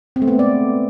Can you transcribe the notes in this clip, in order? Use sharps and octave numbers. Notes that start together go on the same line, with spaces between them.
C4
A3
B3
G#3
D5